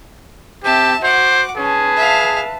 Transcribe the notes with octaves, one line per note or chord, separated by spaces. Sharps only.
C4 G4 E5 A5
F#4 C5 F#5 D6
C#4 G#4 B4 A5
E5 F5